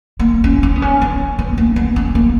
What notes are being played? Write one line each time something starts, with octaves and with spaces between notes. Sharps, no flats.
A#3
C#4
C#4
B3
C#4
B3
B3
A#3
B3
C#4
A#3